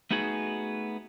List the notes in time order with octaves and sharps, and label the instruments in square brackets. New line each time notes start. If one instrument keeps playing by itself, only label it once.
[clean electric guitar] A3 B3 D#4 F#4 G#4